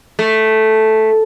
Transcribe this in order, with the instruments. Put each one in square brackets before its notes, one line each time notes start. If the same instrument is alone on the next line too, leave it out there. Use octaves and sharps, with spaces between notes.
[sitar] A3